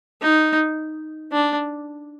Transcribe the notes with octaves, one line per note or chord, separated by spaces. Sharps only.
D#4
D4